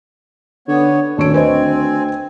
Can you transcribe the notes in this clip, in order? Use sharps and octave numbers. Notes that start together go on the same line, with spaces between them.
D3 B3 C#5
D#1 D2 A4 C#5 C#6 D7
C4 B4 C5 D#5 G#5